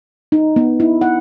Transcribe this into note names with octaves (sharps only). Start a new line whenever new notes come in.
D#4
B3
E4
F#5